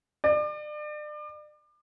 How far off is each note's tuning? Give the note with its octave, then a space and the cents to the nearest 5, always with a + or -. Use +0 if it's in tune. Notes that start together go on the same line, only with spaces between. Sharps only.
D5 +35